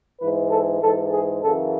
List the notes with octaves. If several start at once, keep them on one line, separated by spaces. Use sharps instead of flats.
G#2 E3 B4
A4
G#2 E3 A4
G#4
F#2 C#3 E3 A4